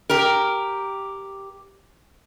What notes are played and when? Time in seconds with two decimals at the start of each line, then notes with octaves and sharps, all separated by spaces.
0.10 G4 A#4